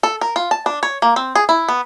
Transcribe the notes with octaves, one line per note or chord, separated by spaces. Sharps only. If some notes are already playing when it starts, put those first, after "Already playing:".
A4
A#4
F4
A5
D4
C#5
A#3
C4
G#4
E4
B3